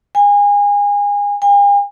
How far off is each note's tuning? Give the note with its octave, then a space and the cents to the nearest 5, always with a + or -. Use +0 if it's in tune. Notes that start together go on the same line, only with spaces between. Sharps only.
G#5 -30
G#5 -45